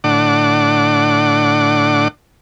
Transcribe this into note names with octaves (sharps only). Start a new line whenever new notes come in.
A2 D3 D4 F#5 D6